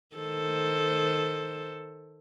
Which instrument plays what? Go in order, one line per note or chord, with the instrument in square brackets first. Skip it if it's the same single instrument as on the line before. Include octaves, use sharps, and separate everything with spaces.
[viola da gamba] D#3 A4 C5